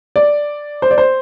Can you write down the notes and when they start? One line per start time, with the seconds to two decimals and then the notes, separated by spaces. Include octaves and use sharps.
0.16 D5
0.82 C5
0.91 D5
0.98 C5